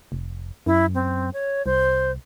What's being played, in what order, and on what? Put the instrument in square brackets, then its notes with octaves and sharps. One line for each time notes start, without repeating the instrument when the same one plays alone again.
[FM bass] F1
[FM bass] F#2 [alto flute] E4
[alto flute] C4
C#5
[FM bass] C2 [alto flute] C5